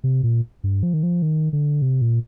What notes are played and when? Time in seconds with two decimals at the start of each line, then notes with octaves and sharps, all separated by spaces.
0.04 C3
0.23 A#2
0.64 G2
0.83 F3
0.94 D#3
1.03 F3
1.22 D#3
1.53 D3
1.82 C3
2.02 A#2